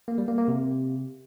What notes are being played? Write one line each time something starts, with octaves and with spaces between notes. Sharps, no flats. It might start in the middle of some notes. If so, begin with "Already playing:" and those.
A#3
G3
A#3
A#3
C3